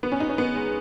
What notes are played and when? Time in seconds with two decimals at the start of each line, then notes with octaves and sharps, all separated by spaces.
0.03 B3
0.12 C#4
0.20 D#4
0.29 C#4
0.38 B3
0.55 G#3